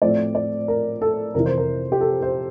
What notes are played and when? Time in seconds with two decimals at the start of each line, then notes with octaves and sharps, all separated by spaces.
0.02 A2 F3 A3 C4 D5
0.35 D5
0.68 A#4
1.02 A4
1.34 F2 C3 E3 A#4
1.46 C5
1.58 A#4
1.92 G4
2.01 A4
2.22 C5